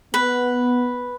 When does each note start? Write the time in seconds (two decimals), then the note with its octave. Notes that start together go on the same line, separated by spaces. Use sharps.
0.14 B3 B4